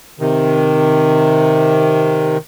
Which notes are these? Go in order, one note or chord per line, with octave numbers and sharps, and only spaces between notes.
C3 D#3